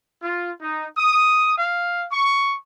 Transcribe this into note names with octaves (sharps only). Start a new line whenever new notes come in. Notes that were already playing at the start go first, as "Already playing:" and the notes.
F4
D#4
D#6
F5
C#6